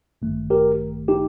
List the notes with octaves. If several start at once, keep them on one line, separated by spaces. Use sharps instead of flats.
A1 G2 D#3 A3
G4 A#4
D#4 G4